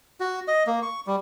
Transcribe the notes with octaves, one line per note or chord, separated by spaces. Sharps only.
F#4
D#5
A#3
C#6
G3